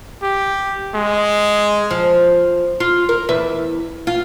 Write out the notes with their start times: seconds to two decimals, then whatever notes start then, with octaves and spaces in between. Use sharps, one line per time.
0.23 G4
0.95 G#3
1.91 F3
2.80 F4
3.09 A#4
3.29 E2 B4 E5
4.07 F4